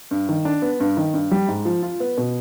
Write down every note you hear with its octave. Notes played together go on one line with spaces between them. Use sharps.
G2
D#3
D4
B3
G2
D#3
G2
G3
G#2
F3
F4
B3
B2